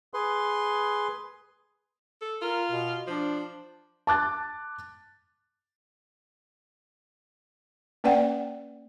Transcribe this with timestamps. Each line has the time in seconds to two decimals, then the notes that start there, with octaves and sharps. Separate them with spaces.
0.14 G#4 B4 C6
2.22 A4
2.42 F4 A#4
2.71 B2
3.08 F3 D4
4.07 A5 D6 F#6 A6
8.04 A#3 C#4 B4 D5 F#5 G5